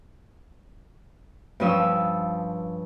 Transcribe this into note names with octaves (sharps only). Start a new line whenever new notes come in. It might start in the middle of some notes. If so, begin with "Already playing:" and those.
G2 F3 C#4 D#6 E6